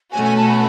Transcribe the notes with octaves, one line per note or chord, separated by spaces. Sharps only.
B2 A3 C#4 F#4 G#5
G#5
A5
B5